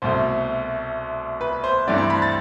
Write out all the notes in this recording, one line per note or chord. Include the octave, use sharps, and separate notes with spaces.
C2 B2 A3 C5
B4
C5
G2 E3 A3 C4 D5
C6
B5
A6